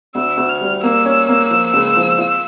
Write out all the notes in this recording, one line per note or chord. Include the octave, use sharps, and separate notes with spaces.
D2 E6
D2
F6
G3
A#3 E6
C#4
A#3
F3
C#2
F3
F4